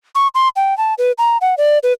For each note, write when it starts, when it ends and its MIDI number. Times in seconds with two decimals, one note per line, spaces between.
0.15 0.28 85
0.35 0.48 84
0.56 0.77 79
0.78 0.94 81
0.98 1.12 71
1.18 1.38 82
1.41 1.55 78
1.58 1.78 74
1.83 1.92 71